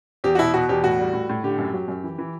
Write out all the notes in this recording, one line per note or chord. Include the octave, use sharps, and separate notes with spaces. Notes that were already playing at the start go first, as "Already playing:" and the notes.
E2 G4
F#4
B2 E4
B2 F#4
E2 G4
A2 F#4
G3
A2
A2
D3 G4
F#2
F#3
F#2
E3
E3